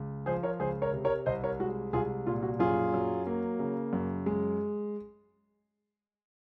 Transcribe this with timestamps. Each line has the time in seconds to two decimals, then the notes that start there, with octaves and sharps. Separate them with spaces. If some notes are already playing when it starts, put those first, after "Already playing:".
Already playing: C#2
0.26 F3 G#4 C5
0.43 A#4 C#5
0.60 C#2 G#4 C5
0.82 A#4 C#5
0.93 C3
1.05 A#4 C#5
1.26 C2 C5 D#5
1.44 A#4 C#5
1.60 G#3 F#4
1.93 C2 F4 G#4
2.26 A#2 F4
2.43 F#4
2.59 F#2 F4 G#4
2.94 F#3
3.27 A#3
3.59 C#3
3.93 F#2
4.26 G#3